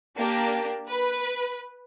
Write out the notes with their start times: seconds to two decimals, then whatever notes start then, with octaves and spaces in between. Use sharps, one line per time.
0.17 A#3 D4 G4
0.88 B4